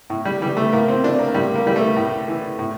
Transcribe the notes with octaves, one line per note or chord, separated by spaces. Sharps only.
A2
G3
E3 G3
A3
A2 A#3
C4
E3 D4
A#3
A2 G3
A#3
E3 G3
A3
A2
E3
A2